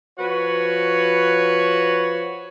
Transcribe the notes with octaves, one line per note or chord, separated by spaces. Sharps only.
F3 F#4 B4 C#5